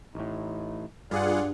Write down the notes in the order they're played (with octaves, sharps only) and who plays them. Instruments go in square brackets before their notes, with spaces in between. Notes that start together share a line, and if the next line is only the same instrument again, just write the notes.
[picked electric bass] A1 A2 [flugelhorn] D#4
[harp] G2 [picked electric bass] G3 [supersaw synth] F4 G#4 F#5 [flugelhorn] D5